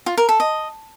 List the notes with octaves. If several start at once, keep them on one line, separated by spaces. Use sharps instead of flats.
F4
A#4
A4
D#5